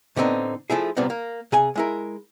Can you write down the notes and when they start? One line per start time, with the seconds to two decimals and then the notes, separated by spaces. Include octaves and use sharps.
0.16 A2 D3 B3 C4 D#4
0.70 F3 A3 E4 G#4
0.97 C2 A#2 G3 B3 C4
1.10 A#3
1.52 C3 G#4 G#5
1.76 G#3 E4 A#4